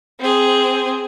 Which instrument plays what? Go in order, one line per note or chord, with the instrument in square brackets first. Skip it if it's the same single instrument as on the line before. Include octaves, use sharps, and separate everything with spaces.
[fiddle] C4 G#4